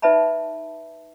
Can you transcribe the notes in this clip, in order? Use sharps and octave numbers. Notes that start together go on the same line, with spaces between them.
D#4 B4 D5 E5 A5 B5